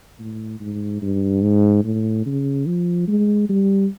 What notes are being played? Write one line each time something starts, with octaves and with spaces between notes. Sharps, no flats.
A2
G#2
G2
G#2
A2
C#3
F3
G#3
G3